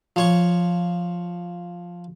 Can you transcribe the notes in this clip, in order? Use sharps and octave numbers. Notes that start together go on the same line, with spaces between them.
F3 C#5 C#6